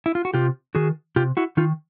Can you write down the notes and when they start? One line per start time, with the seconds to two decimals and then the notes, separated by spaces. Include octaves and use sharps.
0.06 E4
0.15 F4
0.25 F#4
0.34 C3 F4 G4
0.75 D#3 F#4 G#4
1.16 C3 F4 G4
1.37 E4 F#4
1.57 D#3 D#4 F4